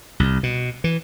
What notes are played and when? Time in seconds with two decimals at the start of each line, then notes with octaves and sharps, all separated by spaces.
0.20 C2
0.43 B2
0.84 E3